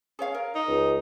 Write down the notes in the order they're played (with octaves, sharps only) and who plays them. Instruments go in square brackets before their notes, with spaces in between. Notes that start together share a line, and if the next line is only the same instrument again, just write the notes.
[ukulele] G#4 C#5 F5
A#4
[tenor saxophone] D#4
[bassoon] C#2